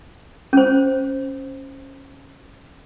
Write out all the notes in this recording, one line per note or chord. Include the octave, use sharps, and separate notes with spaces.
C#4 C5